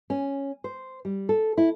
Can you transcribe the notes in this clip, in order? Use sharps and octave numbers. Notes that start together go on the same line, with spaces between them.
C#4
C5
G3
A4
E4